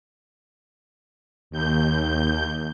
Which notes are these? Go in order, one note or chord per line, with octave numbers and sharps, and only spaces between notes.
D#2 G6